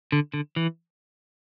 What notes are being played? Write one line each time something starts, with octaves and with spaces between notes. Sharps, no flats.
D3
D3
E3